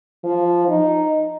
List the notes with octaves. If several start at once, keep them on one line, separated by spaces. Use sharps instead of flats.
F3
D#4